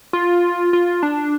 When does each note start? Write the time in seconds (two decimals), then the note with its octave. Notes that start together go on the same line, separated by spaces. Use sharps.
0.13 F4
0.73 F4
1.03 D4